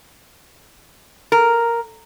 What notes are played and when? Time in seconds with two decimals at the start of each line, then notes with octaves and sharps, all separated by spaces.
1.32 A#4